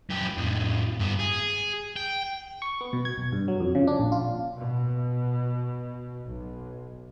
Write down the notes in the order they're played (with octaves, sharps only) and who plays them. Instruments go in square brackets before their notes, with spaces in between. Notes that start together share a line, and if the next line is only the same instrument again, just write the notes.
[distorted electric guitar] F#2 G4
F2 A2
G2 B3
G#4
G5
[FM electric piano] C#6
B3
B2
G#6
B1
G2
F#3
F2
C#3
D4
A#1
F4
[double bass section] B2
B1